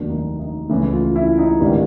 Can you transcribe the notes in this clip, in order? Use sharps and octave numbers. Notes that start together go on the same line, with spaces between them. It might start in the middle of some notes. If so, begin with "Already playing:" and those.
Already playing: F1 D#2 D#3 F#3 D4
D#4
D#4
C#2 C#3 E3 A3 E4
F4
E4
D#4
A1 G#2 D#3 G3 D4